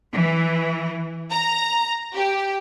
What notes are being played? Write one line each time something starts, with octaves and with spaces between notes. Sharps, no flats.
E3
A#5
G4